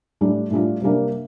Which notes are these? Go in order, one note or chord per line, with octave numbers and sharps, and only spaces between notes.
A2 G3 D4
A2 G3 D4 F4
C3 G3 A#3 D4